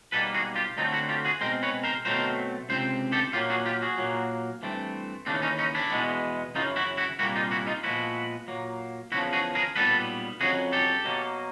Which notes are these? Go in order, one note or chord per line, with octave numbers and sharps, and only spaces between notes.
B1 B2 G3 A#3 A4 B4
F#4 G#4
F4 G4
D2 D3 F#3 A3 C4 D#4 F4
E4 F#4
F4 G4
F#4 G#4
B2 G#3 C4 A#4 C5
B4 C#5
A#4 C5
B2 F#3 A3 C4 A#4 C5
C#2 C3 C4 C5
G4 A4
A#2 F#3 A#3 F4 G4
F#4 G#4
F4 G4
F#4 G#4
A#2 F#3 A#3
G2 E3 A3 C4
D#2 C#3 E3 A3 C4 D4
C#4 D#4
C#4 D#4
D4 E4
E2 B2 G#3 B3
F#2 C#3 E3 D#4 F4
E4 F#4
E4 F#4
C2 A#2 G3 A#3 E4 F#4
D#4 F4
E4 F#4
D#4 F4
A#2 F3 G#3 B3 E4 F#4
A#2 F#3 A#3
E2 C#3 F3 E4 F#4
F#4 G#4
G#4 A#4
B1 A#2 G3 B3 A4 B4
F2 C#3 F#3 F#4 G#4
G4 A4
B2 F#3 A#3